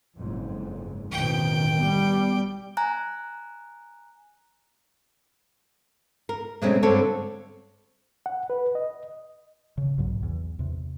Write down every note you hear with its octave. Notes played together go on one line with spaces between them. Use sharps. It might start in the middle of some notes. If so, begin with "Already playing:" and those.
F#1 F2 G#2
A1 F2 B2 D#3 G5
G3 B3
G#5 A#5 F#6
A#4
B2 F#3 G#3 A3 C4 C#4
G2 D3 C4 A4 C#5 A5
F#5
B4
D#5
C#3
B1 G#2 F#3
E2
E2 C3